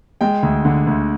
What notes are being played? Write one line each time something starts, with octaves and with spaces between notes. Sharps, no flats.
G#3 G5
D2
D3
D2